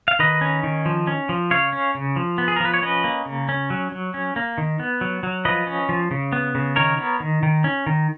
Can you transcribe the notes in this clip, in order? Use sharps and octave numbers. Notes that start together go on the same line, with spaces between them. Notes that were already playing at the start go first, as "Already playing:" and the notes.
F5
D#3 B4 D#5
C#4
D#3
F3
C#4
F3
C#3 C#5 F5
C#4
C#3
F3
B3
G#4
A#4
F3 B4
C#5
C#4 B4 D#5
A#3
C#3
C#4
F#3
F#3
C#4
A#3
D#3
B3
F#3
F#3
F3 B4 D#5
C#4
F3
C#3
B3
C#3
D#3 A#4 C#5
B3
D#3
D#3
C#4
D#3